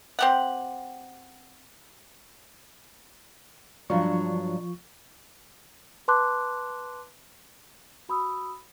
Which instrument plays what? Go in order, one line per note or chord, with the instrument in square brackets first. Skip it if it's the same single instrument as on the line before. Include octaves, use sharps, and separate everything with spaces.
[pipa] C4 G4 F#5
[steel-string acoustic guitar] G2 F#3 D4 [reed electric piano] F3 F4 C#6
[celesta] B4 A5 C6 D6 F#6
F#4 B5 D#6 E6